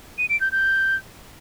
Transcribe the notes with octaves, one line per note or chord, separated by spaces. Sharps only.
D#7
D7
G6
G6